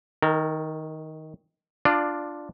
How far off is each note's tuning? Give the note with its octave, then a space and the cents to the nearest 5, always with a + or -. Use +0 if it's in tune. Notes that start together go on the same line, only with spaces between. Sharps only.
D#3 +10 A#4 -30
D4 +5 F4 +0 D5 +20